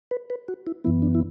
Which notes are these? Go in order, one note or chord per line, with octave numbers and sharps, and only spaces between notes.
B4
B4
F#4
E4
F#2 E3 B3 E4
D4
E4